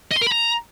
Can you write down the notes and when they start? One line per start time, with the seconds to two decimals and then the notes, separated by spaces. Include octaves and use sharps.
0.11 D#5
0.16 C6
0.21 A#4
0.27 B5
0.32 A#5